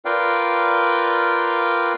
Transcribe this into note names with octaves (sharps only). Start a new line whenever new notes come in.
F4 A#4 B4 D5 F5 G5